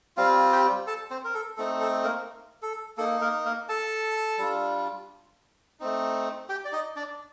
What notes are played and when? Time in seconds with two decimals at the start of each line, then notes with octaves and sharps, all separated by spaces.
0.17 G3 C4 F4 F5
0.52 G4 G5
0.87 A4 A5
1.11 C4 C5
1.24 A#4
1.34 A4
1.57 A3 C4 D#4 A4
1.81 A4
2.04 A#3 A#4
2.62 A4
2.98 A#3 D#4 A4
3.21 A#3 A#4
3.45 A#3 A#4
3.69 A4 A5
4.38 G3 D4 F4
5.80 A3 C4 D#4
6.49 G4 G5
6.65 D5
6.72 D#4 D#5
6.96 D4 D5